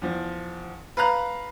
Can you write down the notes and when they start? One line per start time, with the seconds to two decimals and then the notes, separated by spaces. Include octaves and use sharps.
0.02 E2 F3
0.97 B4 F5 A#5 F#6